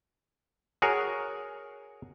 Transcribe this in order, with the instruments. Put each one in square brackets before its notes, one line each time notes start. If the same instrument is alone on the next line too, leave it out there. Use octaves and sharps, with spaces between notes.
[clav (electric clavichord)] F#4 G#4 A#4 C#5